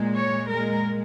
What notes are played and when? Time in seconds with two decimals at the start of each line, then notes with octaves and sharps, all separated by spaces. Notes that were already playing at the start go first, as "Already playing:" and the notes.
Already playing: A#2 G#3
0.16 C#5
0.49 A#2 G#3 A#4